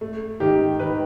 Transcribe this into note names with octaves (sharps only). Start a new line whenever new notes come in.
A3
D#3 G4
D#3 B4